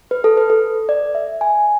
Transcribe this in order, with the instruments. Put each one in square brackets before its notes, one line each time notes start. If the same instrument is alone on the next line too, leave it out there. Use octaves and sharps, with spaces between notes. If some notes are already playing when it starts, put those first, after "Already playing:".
[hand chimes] B4
A4
B4
A4
D5
E5
G#5